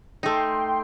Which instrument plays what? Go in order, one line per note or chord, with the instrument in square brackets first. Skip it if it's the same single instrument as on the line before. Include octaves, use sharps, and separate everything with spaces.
[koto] A3 D#4 [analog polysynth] G5 C6